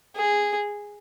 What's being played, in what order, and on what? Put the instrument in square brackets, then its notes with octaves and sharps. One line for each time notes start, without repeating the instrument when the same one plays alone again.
[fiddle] G#4